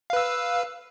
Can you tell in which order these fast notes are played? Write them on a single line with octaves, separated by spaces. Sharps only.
F5 B4 E6